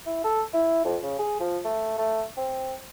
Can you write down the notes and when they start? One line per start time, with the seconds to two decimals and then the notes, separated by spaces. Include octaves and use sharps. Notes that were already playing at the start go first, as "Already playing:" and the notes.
0.06 E4
0.24 A4
0.54 E4
0.85 F2
1.03 C#3
1.19 G#4
1.40 F3
1.65 A3
1.98 A3
2.37 C4